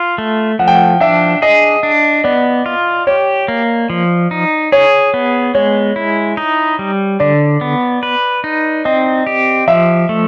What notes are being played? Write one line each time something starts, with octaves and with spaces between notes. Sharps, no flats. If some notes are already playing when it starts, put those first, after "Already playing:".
Already playing: F4
A3
F3 F#5
G5
F#5
D4 E5
G#4 D#5
D4
B3 D5
F4
G4 C#5
A#3
F3
D#4
G#4 C#5
B3
G#3 C#5
E4
D#4
G3
D3 D5
B3
B4
D#4
C4 D#5
G4
F3 E5
A3